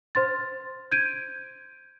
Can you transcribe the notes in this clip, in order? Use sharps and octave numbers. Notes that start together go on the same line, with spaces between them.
C5 C6 A6
G6 G#6 D7 D#7